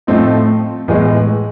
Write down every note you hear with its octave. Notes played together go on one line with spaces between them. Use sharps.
A2 F3 A3 C4 D#4
A2 E3 G#3 B3